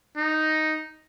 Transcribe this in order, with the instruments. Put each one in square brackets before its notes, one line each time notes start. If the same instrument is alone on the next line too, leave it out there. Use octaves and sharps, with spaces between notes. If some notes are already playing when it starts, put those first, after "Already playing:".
[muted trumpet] D#4